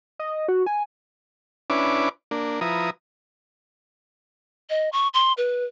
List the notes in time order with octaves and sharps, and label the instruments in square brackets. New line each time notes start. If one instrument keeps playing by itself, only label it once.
[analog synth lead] D#5
F#4
G#5
[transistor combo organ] C#4 D4 E4 B4 D6
A#3 D4
F3 E4 B4 A#5 D#6
[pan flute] D#5
C#6
C6
B4